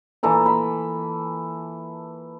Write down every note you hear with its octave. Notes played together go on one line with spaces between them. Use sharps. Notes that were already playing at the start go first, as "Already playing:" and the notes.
A#2 E3 A4 A#5
B5